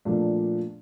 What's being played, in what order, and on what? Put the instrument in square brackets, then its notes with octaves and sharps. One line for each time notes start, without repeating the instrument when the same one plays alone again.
[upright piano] A#2 F3 A3 D4